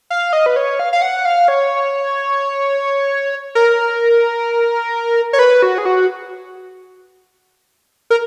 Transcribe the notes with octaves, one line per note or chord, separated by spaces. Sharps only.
F5
D#5
B4
C#5
F5
F5
F#5
F5
C#5
A#4
C#5
B4
F#4
G#4
F#4
A#4